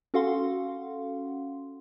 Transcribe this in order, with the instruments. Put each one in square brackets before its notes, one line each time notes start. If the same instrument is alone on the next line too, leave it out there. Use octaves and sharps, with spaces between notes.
[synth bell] C#4 F#4 A4 F5 F#5 C6